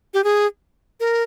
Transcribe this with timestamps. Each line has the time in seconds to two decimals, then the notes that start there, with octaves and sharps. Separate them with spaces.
0.14 G4
0.24 G#4
1.00 A#4